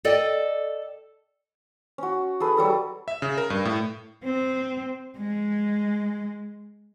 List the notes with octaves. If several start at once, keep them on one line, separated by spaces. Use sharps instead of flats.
A4 D5 D#5 G5
C#4 F#4
G#4 A4 B4
F#3 G3 A4
E5
C#3
A#4
G2
A2
C4
G#3